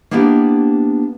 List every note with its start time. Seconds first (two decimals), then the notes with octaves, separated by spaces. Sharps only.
0.11 A#3 B3 D4 E4 G4 E5